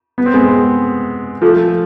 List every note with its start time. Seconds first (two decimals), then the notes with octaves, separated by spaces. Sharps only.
0.18 B3
0.26 C4
0.34 G#3 B3
1.42 F3 A3